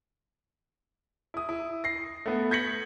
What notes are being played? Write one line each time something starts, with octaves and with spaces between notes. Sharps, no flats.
E4 D#6
E4
A#6 C7
A3 B3
G6 G#6 A#6 B6 C#7 F#7